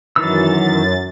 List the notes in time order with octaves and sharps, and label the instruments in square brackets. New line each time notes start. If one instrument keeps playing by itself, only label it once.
[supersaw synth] F#2 A6 [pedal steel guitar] D#3 E3 E6